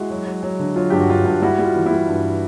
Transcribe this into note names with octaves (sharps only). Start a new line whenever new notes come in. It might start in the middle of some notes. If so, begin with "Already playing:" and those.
Already playing: G#3 E4 F#4
F#3
F#3
F#3
D3
F#3 F4
G2 G4
F#4
G2 F4
G2
G3 E4 F#4
G3
F4
E3
E4
G3
G2